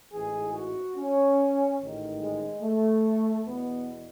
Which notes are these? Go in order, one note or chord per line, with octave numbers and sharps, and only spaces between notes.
A1 G#2 E3 G#4
F#4
C#4
A1 G#2 D#3
G#3
A3
E2 B2 B3